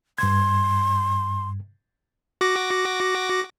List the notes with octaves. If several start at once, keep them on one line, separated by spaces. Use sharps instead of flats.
G2 C6 G#6
F#4 D6 A#6